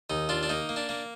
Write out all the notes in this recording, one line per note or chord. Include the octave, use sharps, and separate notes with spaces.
D#2 D#4
D4 F4
D4
A#3 D#4
A#3
D4
A#3